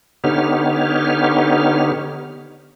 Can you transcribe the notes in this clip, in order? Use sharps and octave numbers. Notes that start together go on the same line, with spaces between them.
D3 B3 D#4 G4 C#5 F6